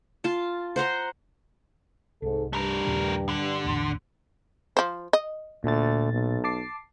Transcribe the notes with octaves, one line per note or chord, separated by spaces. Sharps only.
F4 A5
C5 F#5 A#5 C6
C2 G#2 A4
G2 G3 A3 A#4
D#2 A#2 C#3
D3
A#1 E2 A2
F3 C5
D#5
D2 A#2 A6
B1
A5 D6 C7